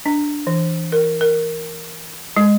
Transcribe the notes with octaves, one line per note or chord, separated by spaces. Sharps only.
D4
E3
A#4
A#4
G#3